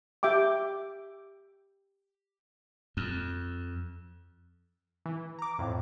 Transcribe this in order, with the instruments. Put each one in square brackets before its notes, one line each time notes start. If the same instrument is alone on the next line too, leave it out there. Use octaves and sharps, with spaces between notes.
[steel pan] G4 E5 G5 D6
[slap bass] F2
[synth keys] E3
A#5 D6
F2 A2